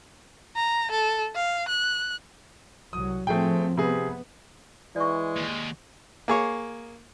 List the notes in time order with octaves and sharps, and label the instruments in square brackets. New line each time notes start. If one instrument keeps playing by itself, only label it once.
[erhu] A#5
A4
F5
F#6
[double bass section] C2 F#3 [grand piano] D#6
[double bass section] A2 F3 C4 [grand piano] A3 G#4 G5
[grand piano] C3 G#4 [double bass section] B3
[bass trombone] E3 [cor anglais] G#3 [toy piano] D5 C#6
[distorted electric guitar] D#2
[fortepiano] A#3 G#4 C#5